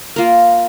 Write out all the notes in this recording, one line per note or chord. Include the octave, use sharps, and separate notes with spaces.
A#3 F4 A#4